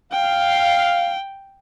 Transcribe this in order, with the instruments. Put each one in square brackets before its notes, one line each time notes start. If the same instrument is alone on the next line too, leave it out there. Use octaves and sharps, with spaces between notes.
[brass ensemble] F5 [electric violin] G5